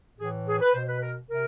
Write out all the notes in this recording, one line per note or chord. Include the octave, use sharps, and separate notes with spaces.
A2 E3 G#4
G#4
B4
B2 C5
B4
A#4
C3 A#4